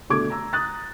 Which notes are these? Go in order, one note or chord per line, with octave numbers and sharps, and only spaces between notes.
B2 D3 A3 D6 G#6
A#5 E6
A#5 D#6 F#6 A6